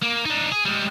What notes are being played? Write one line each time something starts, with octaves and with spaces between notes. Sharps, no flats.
A#3
D4 D#4
G#4
G3 G#3